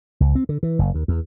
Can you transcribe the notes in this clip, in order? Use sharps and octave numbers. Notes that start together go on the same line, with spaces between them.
C#2
C4
D3
E3
F#1
D#2
E2